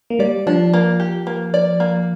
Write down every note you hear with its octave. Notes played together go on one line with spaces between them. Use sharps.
A#3
G3 D5
F3 D4
A#3
G4
A#3
D5
A#3